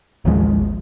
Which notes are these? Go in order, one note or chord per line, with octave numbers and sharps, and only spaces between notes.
A1 D#2 F3 G#3